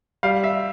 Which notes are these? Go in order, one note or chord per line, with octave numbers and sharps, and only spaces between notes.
G3 F5
E5